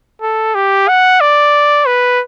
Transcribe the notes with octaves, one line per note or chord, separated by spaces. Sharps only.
A4
G4
F#5
D5
B4